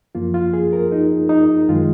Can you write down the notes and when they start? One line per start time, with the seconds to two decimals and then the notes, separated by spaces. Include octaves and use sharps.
0.15 F#2 F3 A#3 F4
0.34 F4
0.53 G#4
0.73 A#4
0.92 D#4
1.29 D#4
1.69 F#2 D#3 G#3 F4